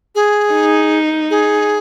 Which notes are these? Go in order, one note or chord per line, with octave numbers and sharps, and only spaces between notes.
G#4
D#4
G#4